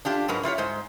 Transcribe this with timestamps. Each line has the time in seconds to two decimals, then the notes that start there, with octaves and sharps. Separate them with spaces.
0.05 D4 F4 G4
0.28 G#2 F#3 A#4 B4
0.43 E4 F4 G4 C#5
0.58 G#2 G#3 C5